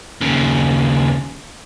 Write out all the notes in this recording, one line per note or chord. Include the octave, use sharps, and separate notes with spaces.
D#2 C#3